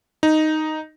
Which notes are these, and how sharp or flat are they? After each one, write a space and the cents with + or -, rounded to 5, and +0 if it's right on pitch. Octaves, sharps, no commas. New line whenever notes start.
D#4 +0